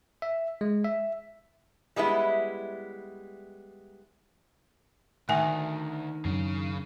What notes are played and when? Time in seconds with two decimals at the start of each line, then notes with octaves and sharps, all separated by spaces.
0.22 E5
0.61 G#3
0.85 E5
1.96 G3 G#3 B3 E4
5.29 D2 D#3 A3 E5 G#5
6.25 F#2 C#3 F#3 D4